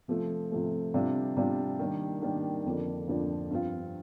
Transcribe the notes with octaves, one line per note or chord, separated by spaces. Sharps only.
C3 F3 A3
C3 F3 A3
C3 G3 D4 F4
C3 G3 D4 F4
D#3 G3 A#3 D4
D#3 G3 A#3 D4
F2 D3 F3 A#3 D4
F2 D3 F3 A#3 D4
G2 F3 C4 F4